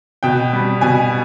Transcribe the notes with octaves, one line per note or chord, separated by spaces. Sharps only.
B2 G5
G3
B2 G#5